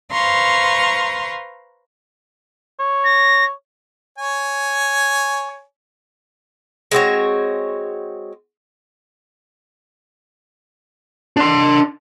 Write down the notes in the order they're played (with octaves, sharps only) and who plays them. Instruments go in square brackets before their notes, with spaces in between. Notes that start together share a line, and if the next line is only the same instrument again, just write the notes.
[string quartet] B4 C5 F5 A#5 C6 C#6
[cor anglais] C#5
[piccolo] A#6
[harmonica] C#5 G#5
[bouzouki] G#3 C4 F#4 C#5
[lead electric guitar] D4 C6